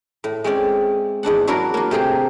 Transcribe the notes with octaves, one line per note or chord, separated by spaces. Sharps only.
A2
G#3 C4 C#4 D5
E2 G#2 D4 F#5
F#3 D4 E4 F#4 A#4
A#3 F4
C3 A3 F4 G#4 G5